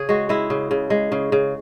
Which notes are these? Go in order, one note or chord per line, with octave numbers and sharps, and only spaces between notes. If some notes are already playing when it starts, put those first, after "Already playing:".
Already playing: C#3 G#4
G#3 F#4
G#3 E4
C#3
C#3
G#3
C#3
C#3